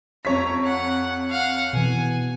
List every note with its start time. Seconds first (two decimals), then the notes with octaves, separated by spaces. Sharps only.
0.25 F2 C#5 A#5 B6
0.64 F#5
1.30 F5 F#5
1.73 B2 E3 G#5